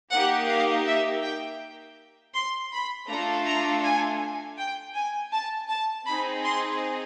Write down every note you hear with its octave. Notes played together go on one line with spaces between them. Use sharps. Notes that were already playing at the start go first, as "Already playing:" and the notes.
A#3 D#4 G4 F#5
F5
E5
G5
C6
B5
A3 D4 F4 A4 A#5
A#5
G#5
G5
G#5
A5
A5
C4 D#4 G#4 B5
C6